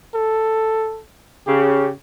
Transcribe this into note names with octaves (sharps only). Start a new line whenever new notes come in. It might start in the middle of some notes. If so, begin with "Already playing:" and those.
A4
C#3 G4